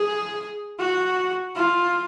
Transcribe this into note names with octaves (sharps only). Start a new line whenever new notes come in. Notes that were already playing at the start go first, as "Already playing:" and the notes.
Already playing: G#4
F#4
F4